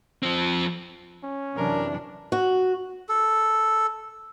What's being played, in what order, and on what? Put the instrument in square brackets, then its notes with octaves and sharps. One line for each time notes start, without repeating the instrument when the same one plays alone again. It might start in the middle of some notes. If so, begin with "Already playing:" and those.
[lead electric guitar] F3 C4
[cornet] C#4
[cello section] F#2 C3 E3 [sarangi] D4 [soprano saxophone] A#4
[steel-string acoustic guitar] F#4
[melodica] A4